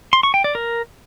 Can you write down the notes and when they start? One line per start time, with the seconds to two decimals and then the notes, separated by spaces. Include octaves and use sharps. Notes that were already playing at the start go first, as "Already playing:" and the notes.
0.13 C6
0.23 C#6
0.34 G5
0.44 D5
0.55 A#4